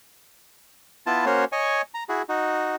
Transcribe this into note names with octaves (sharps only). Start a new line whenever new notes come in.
B3 E4 F4 A5
A#3 C#4 F#4 C5 C#5
C#5 D#5 G#5 C#6
A#5
E4 F#4 G#4
D#4 F#4